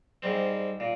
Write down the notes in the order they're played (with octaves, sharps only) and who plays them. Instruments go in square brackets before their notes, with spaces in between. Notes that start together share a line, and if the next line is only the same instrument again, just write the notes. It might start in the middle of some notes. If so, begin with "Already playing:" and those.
[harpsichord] G#2 G3 C4
A#2